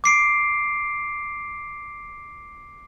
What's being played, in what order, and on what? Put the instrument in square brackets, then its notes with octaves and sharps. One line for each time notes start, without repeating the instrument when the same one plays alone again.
[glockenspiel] D6 C7 D7